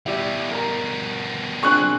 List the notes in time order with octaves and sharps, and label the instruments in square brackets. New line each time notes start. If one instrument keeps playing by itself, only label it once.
[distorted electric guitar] B2 G3 [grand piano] E4 G4 D5
[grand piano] A#4 A#5
[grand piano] C4 D4 G#4 [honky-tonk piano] C#6 F#6